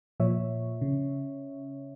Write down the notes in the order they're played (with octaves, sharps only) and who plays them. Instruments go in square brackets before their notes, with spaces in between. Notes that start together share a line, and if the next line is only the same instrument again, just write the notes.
[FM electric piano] A#2 F3 C#5 E5
C#3